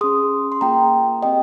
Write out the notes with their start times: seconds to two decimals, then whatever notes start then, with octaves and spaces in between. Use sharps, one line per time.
0.01 C#4 G#4 C6 D#6
0.52 C6
0.61 A#3 F4 G#4 G5 A#5
1.22 C4 G4 D#5 G5